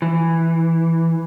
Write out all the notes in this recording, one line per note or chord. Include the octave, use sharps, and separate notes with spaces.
E3